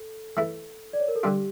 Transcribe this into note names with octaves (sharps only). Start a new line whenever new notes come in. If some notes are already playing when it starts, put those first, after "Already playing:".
Already playing: A4
E3 A3 E4
D5
C#5
A#4
A4
D3 G3 D4 F4 G4